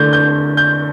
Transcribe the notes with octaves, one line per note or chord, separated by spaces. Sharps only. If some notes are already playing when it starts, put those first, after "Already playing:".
Already playing: D3 A3 D4 G6
G6
G6